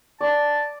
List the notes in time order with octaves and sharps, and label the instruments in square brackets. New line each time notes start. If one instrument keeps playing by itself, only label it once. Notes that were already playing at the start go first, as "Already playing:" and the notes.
[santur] D5 [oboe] A5